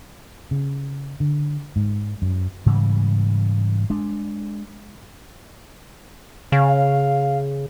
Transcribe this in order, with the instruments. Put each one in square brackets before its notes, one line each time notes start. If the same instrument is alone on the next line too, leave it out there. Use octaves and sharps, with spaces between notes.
[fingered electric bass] C#3
D3
G#2
F#2
[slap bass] G#2 C#3 E3 G3
G#3 D4
[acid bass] C#3 [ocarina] F5